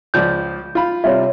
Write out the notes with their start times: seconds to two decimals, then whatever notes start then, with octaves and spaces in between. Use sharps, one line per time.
0.14 C#2 F3 D5 G6
0.75 F4 B5
1.04 C3 G3 F4 C#5 E5